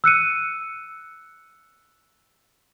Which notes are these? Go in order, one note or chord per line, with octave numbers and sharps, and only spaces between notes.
E6 F#6 C#7 D#7